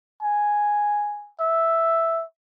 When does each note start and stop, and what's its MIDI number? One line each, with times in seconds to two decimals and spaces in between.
0.23 1.31 80
1.40 2.23 76